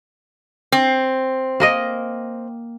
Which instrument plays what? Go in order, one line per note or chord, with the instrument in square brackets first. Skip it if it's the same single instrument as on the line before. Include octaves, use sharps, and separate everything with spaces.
[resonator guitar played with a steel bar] C4
[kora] A#3 A#4 D#5